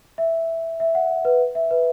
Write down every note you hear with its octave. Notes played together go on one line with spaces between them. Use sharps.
E5
E5
F#5
B4
E5
B4